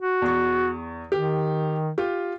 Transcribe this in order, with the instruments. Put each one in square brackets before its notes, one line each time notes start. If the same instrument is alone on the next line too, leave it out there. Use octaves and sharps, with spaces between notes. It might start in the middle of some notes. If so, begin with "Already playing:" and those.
[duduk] F#4
[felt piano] E2 C#6
[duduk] D#3 [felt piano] G4
[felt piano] F4 G4